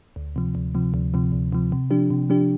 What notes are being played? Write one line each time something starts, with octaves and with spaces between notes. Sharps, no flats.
D2
C3 F3
D2
C3 F3
D2
C3 F3
D2
C3 F3
C3
F3 D4 G4
C3
F3 D4 G4